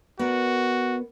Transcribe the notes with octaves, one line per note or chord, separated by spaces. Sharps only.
B3 F#4 A#4 D5